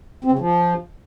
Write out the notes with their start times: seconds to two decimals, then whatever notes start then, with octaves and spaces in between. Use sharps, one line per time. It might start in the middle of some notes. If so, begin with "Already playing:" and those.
0.24 C4
0.32 C#3
0.39 F3